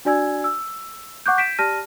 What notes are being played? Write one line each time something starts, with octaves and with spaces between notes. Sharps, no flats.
D4 F#4 D5 G#5 E6 G#6
E6
F#5 C#6 D6 F#6 G6
G6 B6 D7 E7
G4 D5 A5 F6 A#6 D#7